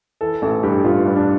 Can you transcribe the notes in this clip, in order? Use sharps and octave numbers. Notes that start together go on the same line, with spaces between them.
E3 A4
A1 A4
G2 G4
A1 F4
G2 D4
D4